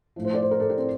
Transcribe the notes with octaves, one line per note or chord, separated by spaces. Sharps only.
A2 F3
C5
D5
C5
A#4
A4
G4
C4